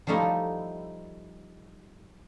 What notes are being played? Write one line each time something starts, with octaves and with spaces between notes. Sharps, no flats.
F3 G3 A3 D#4 E4